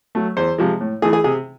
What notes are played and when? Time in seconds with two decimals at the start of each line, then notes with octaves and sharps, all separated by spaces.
0.15 F#3 A3
0.37 E2 C5
0.58 C3 F3 G#3
0.81 A2
1.02 E3 A3 G#4
1.13 G#4
1.24 C3 G#4